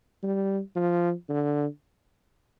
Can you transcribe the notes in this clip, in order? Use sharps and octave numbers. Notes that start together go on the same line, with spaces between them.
G3
F3
D3